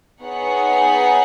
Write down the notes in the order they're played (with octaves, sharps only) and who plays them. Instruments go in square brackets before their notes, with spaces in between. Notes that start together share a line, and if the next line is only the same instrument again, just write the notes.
[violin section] B3 D#4 G#4 C#5 F#5